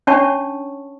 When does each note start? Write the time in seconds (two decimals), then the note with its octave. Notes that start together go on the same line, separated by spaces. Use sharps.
0.07 C#4 D4 C#5 A5 C#6